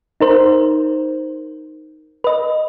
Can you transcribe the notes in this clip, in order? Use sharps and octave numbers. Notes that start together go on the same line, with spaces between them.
D#4 A#4 C5
B4 D#5